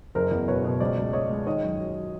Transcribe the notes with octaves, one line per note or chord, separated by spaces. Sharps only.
F#1 A#4 C5
E2
B2 B4 C#5
B2
C#2 C5 D5
C#2
G#3 C#5 D#5
G#3
D#3 C#5 D#5
F#2
F#3
F#3